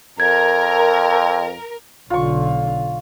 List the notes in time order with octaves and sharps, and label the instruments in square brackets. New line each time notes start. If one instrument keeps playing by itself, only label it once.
[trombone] F2 [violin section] A#4 [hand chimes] G#6
[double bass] B1 D3 [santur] F4 C#6